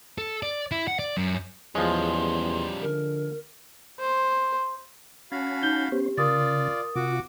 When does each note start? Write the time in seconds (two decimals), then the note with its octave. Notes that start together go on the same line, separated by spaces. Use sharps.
0.18 A4
0.43 D5
0.72 E4
0.88 F#5
0.99 D5
1.17 F#2
1.75 E2 F3 G3 G#3 C#4 C6
2.82 D3 A#4
4.00 C5
5.32 C#4 F#4 F5 G#5 A5 B5
5.63 D#4 G6 G7
5.92 B3 C#4 G4 C5
6.17 C#3 F4 A#4 D5 D#6 A6
6.96 C3 F4 F#4 D6